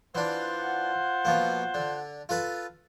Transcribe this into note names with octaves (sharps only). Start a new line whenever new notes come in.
E3 D4 F4 C5 F#5
B2 F3 A#3
D3
F4 A4 B4